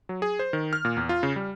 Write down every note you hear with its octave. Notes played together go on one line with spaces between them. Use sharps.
F#3
G#4
C5
D#3
F6
A#2
E2
F4
C#3
G3